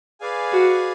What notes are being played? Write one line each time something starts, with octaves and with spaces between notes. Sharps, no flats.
G#4 B4 D5 F5 G#5
F#4